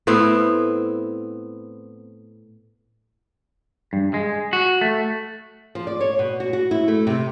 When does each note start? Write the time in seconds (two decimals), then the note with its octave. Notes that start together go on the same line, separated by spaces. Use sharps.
0.07 A2 B3 C4 E4
3.93 G2
4.14 G#3
4.53 F#4
4.81 A3
5.75 F3
5.87 D5
6.01 C#5
6.19 B2
6.40 F#4
6.53 F#4
6.71 E4
6.88 A3
7.07 C3